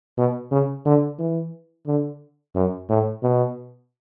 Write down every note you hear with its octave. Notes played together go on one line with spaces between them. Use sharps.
B2
C#3
D3
E3
D3
F#2
A2
B2